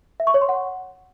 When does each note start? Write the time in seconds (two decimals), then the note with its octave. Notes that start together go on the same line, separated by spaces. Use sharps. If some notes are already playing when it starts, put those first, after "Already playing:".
0.20 E5
0.27 C#6
0.34 C#5
0.41 C6
0.49 F#5